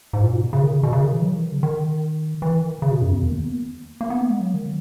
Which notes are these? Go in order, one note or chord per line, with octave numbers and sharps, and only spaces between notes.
G#2
A#2
B2
C#3
D#3
C#3
B2
C#3
D#3
E3
F#3
E3
D#3
C#3
D#3
E3
D#3
C#3
B2
F#2
E2
D#3
A#3
B3
A#3
A#3
B3
A#3
G#3
F#3
D#3